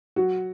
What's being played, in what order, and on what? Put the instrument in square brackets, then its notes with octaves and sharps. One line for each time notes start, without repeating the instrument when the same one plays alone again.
[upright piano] F#3 F#4